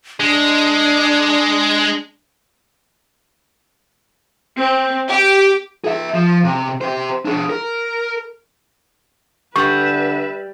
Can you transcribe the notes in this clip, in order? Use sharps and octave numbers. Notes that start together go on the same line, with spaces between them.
G#3 D4
C4
G4
G#4 E5
F3
C3
G4 C5
D4 G#4
A#4
D3 G3 B4 E5 C#6